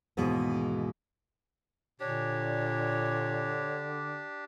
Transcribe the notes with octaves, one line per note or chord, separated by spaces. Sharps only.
D#2 G#2 B2 E3 G#3
A#2 D3 D4 G4 C#5